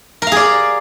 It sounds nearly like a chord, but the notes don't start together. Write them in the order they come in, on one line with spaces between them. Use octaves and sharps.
A#4 F5 G#4 D5